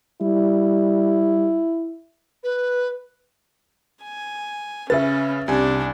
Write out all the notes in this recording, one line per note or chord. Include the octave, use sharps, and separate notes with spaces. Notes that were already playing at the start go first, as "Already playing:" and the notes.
G3 E4
B4
G#5
C#3 C#4 B4 E5 A6
C2 C3 D4 G#5